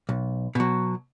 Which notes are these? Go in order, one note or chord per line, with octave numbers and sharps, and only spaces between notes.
B1
B2 F#3